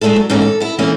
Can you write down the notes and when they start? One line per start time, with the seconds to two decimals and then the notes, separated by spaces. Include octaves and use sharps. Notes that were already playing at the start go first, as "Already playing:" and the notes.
0.01 G#3 A3 C4 D4 E4 A4
0.16 F#3
0.30 G#2 E3 A3 A#3 C#4
0.42 A4
0.60 B3 E4
0.79 E3 A3 A#3 C4 C#4 E4